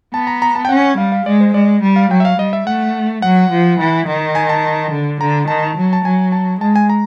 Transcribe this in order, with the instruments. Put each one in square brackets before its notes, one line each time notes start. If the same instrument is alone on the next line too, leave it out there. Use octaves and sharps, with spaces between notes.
[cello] B3 [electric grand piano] A5
[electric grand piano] A#5
A#5
A5
G5
[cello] C#4 [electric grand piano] F#5
[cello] G3 [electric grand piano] F5
[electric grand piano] F5
[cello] G#3 [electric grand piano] D5
[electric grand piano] C5
[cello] G#3 [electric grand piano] D5
[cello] G3
[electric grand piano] F5
[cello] F#3 [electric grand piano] G5
[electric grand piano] E5
F5
[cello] G3 [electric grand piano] D#5
[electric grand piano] E5
[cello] A3 [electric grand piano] F#5
[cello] F#3 [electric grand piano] F#5
[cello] F3
E3
D#3
[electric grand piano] G#5
A5
[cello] D3
[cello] D3 [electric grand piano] A#5
[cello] D#3 [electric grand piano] A5
[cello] F#3
[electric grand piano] A5
[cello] F#3 [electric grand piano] G#5
[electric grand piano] A5
[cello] G#3 [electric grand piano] A5
[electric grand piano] G#5
A#5